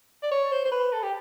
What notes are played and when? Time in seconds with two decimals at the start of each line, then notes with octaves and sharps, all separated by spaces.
0.23 D5
0.32 C#5
0.52 C5
0.65 C5
0.71 B4
0.93 A4
1.03 G4